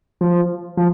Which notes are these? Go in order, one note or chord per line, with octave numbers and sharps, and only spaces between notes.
F3
F3